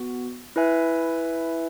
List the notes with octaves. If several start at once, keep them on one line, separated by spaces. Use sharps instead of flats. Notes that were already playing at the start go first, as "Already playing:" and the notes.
Already playing: B3 F#4
E4 B4 E5 G#5